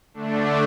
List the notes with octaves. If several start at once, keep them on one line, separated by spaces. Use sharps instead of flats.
D3 A3 D4